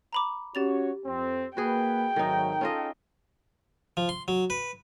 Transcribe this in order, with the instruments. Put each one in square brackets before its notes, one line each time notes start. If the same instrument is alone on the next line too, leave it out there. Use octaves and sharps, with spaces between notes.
[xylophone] A#5 B5 D6
[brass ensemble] C#4 F#4 C#5 [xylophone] G4 A6 F7
[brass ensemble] F2 C4
[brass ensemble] A#3 B4 [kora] F#4 G#4 [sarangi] G5
[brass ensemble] G#1 F#3 A3 [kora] D#3 D#4
[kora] C#4 F4 D#5 [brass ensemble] A4
[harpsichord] F3
C6
F#3
B4